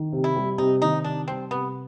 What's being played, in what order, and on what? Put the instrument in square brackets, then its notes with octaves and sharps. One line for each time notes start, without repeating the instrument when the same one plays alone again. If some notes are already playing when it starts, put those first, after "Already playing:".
Already playing: [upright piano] D#3
C3
[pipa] E4
[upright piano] G3
[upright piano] C3 [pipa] D#4
[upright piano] D#3 [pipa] D#4
[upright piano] C3 [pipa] D4
[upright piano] G3 [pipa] C4
[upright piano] C3 [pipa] B3